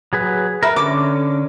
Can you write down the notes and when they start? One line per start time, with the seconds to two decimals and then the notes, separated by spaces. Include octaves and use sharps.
0.13 F#3 G#4 B4
0.63 A#4 B4 E5
0.76 D3 C#4 A4 D6